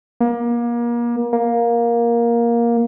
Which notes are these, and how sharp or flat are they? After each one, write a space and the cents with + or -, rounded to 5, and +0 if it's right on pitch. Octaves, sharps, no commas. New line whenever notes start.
A#3 +30
A#3 +10